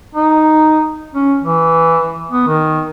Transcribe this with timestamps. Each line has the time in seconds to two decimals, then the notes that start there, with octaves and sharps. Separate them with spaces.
0.15 D#4
1.15 C#4
1.44 E3
2.31 B3
2.47 D#3